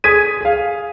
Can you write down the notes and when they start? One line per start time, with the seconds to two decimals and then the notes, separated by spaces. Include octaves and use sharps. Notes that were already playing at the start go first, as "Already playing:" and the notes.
0.04 G#4 D#6 G#6 B6 D#7
0.41 G#4 F5